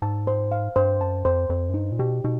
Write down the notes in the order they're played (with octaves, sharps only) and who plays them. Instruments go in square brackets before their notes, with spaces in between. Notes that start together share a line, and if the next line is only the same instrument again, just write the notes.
[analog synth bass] G#2 [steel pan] A5
[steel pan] C5
F5
[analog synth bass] G2 [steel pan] C5
[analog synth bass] F#2 [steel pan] A5
[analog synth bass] F2 [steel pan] C5
[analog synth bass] F2 [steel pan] C5
[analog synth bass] F#2
[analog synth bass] G2 [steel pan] D#4
[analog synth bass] A#2
[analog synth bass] B2 [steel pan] G4
[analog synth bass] B2 [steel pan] D#4